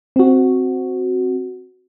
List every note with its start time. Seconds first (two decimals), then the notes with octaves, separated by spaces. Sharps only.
0.16 C4 F#4